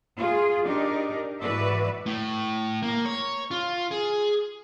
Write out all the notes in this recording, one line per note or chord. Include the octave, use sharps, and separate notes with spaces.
F4 G#4
D4 D#4 G4 A#4 D5
G#2 E3 F#4 B4 D5 E5
A2
A#3
C#5
F4
G#4